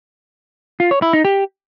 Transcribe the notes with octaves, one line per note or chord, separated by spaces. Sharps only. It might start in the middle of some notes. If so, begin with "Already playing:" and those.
F4
C#5
E4
D#4
G4